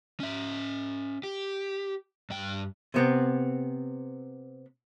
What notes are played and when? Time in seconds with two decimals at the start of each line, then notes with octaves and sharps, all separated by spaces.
0.20 C#4 E5
1.23 G4
2.30 G2 G5
2.94 C3 B3 C4